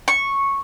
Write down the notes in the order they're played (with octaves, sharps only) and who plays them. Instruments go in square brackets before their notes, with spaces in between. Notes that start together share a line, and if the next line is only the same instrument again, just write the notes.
[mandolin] C#6